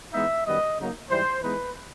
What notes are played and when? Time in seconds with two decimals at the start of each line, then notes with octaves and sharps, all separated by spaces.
0.13 E3 G#3 B3 D#4 E5
0.46 F#2 D#3 G3 B3 D#5
0.78 C#3 F#3 A#3 D#4
1.10 G#2 E3 G3 C5
1.42 E3 G#3 B3 D#4 B4